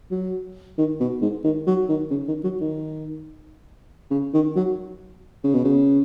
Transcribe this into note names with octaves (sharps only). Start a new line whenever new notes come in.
F#3
D#3
B2
G#2
D#3
F#3
D#3
C#3
D#3
F#3
D#3
C#3
D#3
F#3
C#3
B2
C#3